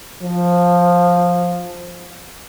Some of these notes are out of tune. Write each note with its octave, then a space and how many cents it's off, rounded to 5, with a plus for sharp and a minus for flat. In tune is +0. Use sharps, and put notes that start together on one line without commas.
F3 +10